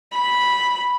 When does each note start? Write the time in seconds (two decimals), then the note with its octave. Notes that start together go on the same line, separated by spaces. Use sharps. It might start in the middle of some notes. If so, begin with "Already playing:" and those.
0.14 B5